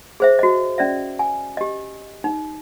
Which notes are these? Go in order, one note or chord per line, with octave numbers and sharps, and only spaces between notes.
G#4 C5 E5
F#4 D#5
C#4 D5 E5
G#5
G4 D#5
D#4